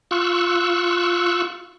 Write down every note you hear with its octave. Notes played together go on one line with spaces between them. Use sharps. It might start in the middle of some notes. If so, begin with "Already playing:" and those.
F4 C#6 E6 F#6